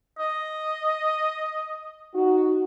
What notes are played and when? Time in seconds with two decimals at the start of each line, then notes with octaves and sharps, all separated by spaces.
0.19 D#5
2.15 D#4 F#4